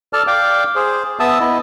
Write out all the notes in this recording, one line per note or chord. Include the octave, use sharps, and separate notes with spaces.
A4 D5 A5 F6
D5 F5 G5 D6
G#4 C5
B3 E5 A5 D#6 E6
B3 E4 D#5